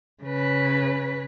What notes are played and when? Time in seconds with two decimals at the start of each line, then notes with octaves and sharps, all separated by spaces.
0.23 C#3 B4